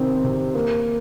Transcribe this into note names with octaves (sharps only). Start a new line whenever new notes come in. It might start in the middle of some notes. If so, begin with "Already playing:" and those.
Already playing: C3 D#3 C4
C3
A#3